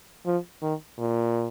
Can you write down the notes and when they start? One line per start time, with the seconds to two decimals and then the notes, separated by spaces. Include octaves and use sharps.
0.26 F3
0.62 D#3
0.99 A#2